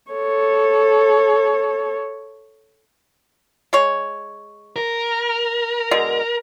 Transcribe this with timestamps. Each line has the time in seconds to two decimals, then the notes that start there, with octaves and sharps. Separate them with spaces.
0.12 A4 C#5
3.73 G#3 C#5
4.76 A#4
5.91 B2 D3 G#3